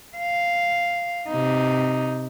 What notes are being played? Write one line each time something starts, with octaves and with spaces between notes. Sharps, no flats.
F5
C3 D#4